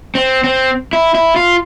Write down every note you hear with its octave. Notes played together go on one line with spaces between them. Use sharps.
C4
C4
E4
E4
F4